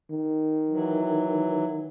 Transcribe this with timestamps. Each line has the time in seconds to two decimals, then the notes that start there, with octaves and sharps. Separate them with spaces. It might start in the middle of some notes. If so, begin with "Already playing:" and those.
0.11 D#3
0.69 E3 F#3